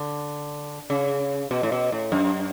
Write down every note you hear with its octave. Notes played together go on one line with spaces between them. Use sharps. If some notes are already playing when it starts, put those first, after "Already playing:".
Already playing: D3
C#3
B2
A2
B2
A2
F#2